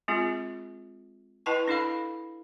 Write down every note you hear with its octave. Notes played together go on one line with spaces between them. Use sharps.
G#3 C4 F4 G#4
E4 B4 D#5 G5 A5 C#6
D4 E4 A4 F5 B5